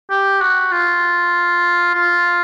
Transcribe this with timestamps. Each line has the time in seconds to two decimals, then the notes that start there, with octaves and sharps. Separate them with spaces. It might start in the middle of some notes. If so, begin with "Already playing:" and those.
0.11 G4
0.42 F#4
0.72 F4
1.95 F4